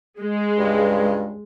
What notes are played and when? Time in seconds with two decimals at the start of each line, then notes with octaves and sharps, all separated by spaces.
0.20 G#3
0.57 C#2 G2